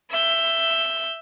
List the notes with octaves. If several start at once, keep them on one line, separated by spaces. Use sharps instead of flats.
E5 G6